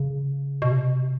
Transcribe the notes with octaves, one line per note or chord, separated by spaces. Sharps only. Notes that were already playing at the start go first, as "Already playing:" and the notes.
Already playing: C#3
B2
C3